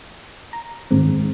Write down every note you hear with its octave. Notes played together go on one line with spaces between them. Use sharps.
A#5
G#2 D#3 G#3 C4